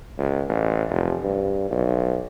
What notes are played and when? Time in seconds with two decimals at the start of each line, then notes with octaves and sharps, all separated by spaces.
0.18 C#2
0.49 A1
0.89 F1
1.24 G2
1.71 B1